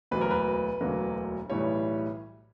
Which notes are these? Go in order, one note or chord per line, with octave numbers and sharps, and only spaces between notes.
E1 D2 D3 F#3 A#3 B4
A#4
B4
E1 D2 D3 F#3 A#3
B1 A2 E3 G3 C#5